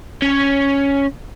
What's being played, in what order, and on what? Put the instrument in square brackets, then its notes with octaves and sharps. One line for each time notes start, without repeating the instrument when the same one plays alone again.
[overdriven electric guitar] C#4 C#5